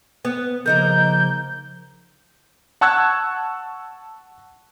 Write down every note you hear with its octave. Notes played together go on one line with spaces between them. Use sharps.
B3
C#3 F3 A#3 D#4 A#4 G6
F#5 A5 C#6 E6 F#6 G#6